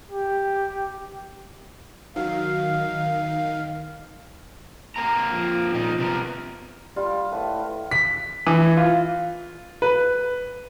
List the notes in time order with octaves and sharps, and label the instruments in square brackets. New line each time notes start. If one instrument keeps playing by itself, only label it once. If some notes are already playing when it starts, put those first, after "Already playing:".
[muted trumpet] G4
[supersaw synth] D#3 [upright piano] F#3 [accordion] F5
[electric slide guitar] A#3 C4 A#5
[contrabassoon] F3
[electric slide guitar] A#2 D#4
C3 B3 A#4
[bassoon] G3 [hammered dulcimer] F4
[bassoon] A2 [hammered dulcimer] B4
[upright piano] B6
E3
F4
B4